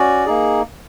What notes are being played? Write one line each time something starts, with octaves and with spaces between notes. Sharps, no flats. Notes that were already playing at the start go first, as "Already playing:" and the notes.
Already playing: C#4 F#4 D5
A#3 D#4 G#4